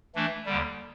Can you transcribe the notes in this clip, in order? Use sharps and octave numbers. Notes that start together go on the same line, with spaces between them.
E3 A3 D4
D#2 D3 G3